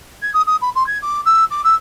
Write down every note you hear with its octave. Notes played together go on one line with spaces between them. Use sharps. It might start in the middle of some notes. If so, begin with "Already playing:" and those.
G#6
D#6
D#6
B5
C6
G#6
D6
E6
D6
E6